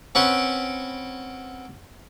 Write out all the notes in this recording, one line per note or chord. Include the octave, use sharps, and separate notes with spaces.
C4 C#4 B4 F#5 G5 C#6